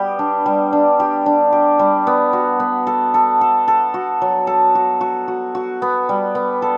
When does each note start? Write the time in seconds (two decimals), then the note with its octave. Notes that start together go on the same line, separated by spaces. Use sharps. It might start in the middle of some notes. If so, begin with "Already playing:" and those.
Already playing: G3 B3 G4
0.19 D4
0.46 G3
0.73 D4
1.00 G4
1.26 D4
1.52 G4
1.79 G3
2.07 B3
2.33 F#4
2.60 B3
2.87 A4
3.14 A4
3.41 A4
3.68 A4
3.94 F#4
4.22 F#3
4.47 A4
4.75 F#4
5.01 F#4
5.28 F#4
5.55 F#4
5.82 B3
6.09 G3
6.35 B3
6.62 A4